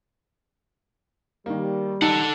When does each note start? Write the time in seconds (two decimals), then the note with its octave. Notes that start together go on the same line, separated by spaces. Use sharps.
1.46 D#3 G3 A#3
2.02 D#4 A4 F#5 A5